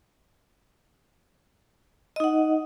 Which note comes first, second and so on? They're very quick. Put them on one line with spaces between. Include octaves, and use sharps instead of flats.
D#5 D#4 F#5